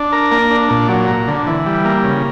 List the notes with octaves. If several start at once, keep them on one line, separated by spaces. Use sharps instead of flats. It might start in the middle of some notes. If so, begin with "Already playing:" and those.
Already playing: D4
A#4
A#3
D4
A#2
F#3
A#3
D3
E3
G3
A#3
C#3